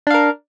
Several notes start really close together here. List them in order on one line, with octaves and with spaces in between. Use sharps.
D4 F5 A#4